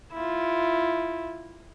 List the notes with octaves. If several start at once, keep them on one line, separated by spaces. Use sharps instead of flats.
E4 F4